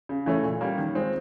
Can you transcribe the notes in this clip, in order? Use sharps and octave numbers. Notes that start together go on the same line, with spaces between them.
C#3
E3 A3 C#4
A#2
G3 A#3 C#4
D#3
G#3 C4 F4